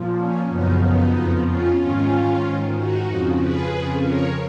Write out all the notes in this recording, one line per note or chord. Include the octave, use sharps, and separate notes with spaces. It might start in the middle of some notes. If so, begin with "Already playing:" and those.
Already playing: A#2 F3
C#4
F#2 C#3 F3 B3 D#4
B3 D#4
F2 F3
C#4 F4
G#2 D#3 C#4 F4
G#2 D#3
D#4 F#4
F2 C#3 F3
G#4 B4
F2 C#3 F3
A#4 C#5